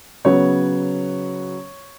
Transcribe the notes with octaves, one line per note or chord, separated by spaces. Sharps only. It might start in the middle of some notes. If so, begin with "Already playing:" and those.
C#3 F#3 B3 C#5